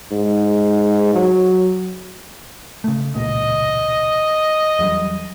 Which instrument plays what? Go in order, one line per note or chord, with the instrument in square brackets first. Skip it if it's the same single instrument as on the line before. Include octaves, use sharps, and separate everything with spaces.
[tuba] G#2
F#3
[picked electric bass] C#3 A3
[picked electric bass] E1 C#2 A#2 [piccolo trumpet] D#5
[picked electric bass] E2 F#3 G3